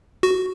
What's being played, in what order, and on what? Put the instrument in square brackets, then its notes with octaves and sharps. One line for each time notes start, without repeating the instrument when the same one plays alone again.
[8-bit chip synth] F#4